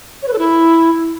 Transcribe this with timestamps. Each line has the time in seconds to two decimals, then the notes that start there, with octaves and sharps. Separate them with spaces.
0.22 C#5
0.28 B4
0.33 A4
0.38 E4